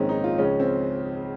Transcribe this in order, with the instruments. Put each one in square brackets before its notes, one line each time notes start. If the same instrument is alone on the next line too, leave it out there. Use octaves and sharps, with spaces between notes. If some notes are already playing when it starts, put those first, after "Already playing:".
Already playing: [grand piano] A#1 G#2 D#3 C4 C#4
D#4
F4
C#2 C#3 F3 C#4
C4